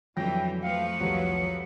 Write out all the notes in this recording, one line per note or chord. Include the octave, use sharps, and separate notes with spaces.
F2 D3 E3 F#3 G3 G5 A#6
F3 A3 B4 F5 C#7
C2 F2 F#3